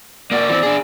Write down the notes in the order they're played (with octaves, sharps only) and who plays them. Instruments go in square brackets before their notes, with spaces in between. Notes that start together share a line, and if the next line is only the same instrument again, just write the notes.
[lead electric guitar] A#3 F#4 [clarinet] D5
[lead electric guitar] E3 C4
D4 G#4